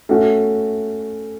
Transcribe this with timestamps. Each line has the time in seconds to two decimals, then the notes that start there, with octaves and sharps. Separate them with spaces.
0.09 A3 C#4 F#4